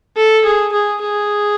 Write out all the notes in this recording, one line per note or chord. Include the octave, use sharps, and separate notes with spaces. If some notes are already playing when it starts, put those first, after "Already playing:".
A4
G#4
G#4
G#4